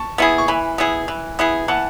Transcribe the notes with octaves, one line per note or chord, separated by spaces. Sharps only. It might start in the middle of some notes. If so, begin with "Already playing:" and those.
Already playing: A5 C#6
B3 E4 G#4
C#6
E3 G#5 B5
B3 E4 G#4
E3
B3 E4 G#4
E3 F#5 A5